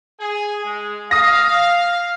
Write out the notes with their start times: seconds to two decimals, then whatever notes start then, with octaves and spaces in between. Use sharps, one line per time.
0.20 G#4 G#5
0.64 G#3
1.11 F5 D#6 A#6